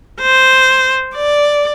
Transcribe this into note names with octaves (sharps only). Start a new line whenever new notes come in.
C5
D5